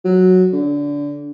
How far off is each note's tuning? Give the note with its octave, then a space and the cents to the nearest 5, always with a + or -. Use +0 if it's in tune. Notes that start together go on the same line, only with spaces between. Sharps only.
F#3 -5
D3 -20